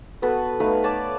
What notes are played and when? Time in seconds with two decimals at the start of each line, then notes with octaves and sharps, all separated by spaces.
0.22 B3 F#4 A4 B4
0.60 A3 D#4 B4 F5
0.84 C#5 D5 A5 D6